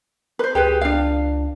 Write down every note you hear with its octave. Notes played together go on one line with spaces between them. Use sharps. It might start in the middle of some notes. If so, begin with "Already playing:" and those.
B4 C5
C#2 G4 G#4 B4
D4 F5